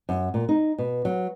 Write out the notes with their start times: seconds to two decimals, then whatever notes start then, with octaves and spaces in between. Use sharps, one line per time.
0.09 F#2
0.34 A#2
0.49 D#4
0.79 B2
1.05 F#3